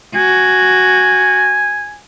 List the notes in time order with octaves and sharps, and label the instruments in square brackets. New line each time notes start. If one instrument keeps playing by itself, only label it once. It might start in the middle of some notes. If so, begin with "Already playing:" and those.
[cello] F#4 [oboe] G#5